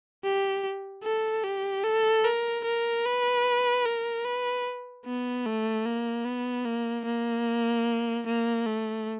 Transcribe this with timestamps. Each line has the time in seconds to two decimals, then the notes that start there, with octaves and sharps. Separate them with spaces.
0.24 G4
1.03 A4
1.44 G4
1.84 A4
2.24 A#4
2.64 A#4
3.05 B4
3.85 A#4
4.25 B4
5.06 B3
5.46 A3
5.86 A#3
6.25 B3
6.65 A#3
7.05 A#3
8.26 A#3
8.66 A3